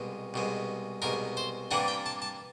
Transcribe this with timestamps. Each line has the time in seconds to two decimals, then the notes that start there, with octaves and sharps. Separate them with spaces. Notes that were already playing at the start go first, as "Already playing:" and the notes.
Already playing: C2 B2 G#3
0.34 C2 B2 G#3
1.02 C2 B2 G#3 A#4
1.37 C5
1.71 C3 E3 G3 A#3 D4 F#5
1.88 G5
2.06 A5
2.22 A5